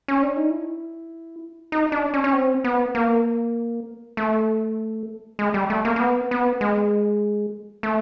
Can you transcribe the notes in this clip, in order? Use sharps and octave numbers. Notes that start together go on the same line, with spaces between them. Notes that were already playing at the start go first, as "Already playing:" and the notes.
C#4
D4
D#4
E4
D#4
D4
C#4
C#4
C4
B3
A#3
A3
G#3
G3
A3
A#3
A#3
B3
B3
G#3
A3